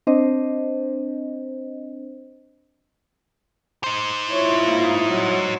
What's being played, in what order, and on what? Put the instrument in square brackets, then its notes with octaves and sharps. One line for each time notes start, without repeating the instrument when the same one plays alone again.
[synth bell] C4 D4 C5 D#5
[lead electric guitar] D#4 C5
[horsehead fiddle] E4 F4 [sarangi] C#5
[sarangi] A#3
F#3